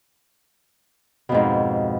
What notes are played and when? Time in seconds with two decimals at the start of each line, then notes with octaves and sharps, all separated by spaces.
1.29 B2
1.32 F2
1.34 G#2